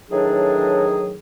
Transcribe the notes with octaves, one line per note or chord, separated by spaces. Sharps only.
A2 D#3 E3 F#3 D4 G#4